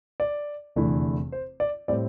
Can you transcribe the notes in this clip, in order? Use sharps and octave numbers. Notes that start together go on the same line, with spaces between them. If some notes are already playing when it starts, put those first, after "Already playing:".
D5
F1 E2 D3 A3 E4
C5
D5
A2 G3 C4 D5